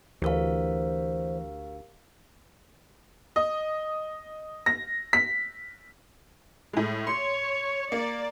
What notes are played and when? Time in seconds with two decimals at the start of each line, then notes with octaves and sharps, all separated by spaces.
0.22 D2 E3 G4 A#4 C5 F5
3.36 D#5
4.66 A#6
5.13 B6
6.73 A2 G#3
7.07 C#5 C6 C#7
7.92 A#3 D5